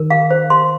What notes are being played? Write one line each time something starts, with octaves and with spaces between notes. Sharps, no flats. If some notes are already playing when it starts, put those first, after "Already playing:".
Already playing: D#3 A#4
F5
C5
C6